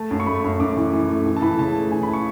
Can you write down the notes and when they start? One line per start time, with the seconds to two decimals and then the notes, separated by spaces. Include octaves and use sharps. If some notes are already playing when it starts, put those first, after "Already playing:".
Already playing: A3 A5
0.11 F#2
0.20 C#6
0.26 A3 B5
0.44 F#2
0.60 F#2 D6
0.77 E3
0.93 E3
1.09 A3
1.26 E3
1.36 A5
1.42 E3 B5
1.58 C#3 A5
1.75 A3
1.91 E3 G#5
2.03 B5
2.08 A3
2.13 C#6